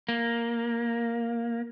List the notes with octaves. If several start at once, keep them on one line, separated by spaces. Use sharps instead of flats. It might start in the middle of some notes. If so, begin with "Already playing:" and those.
A#3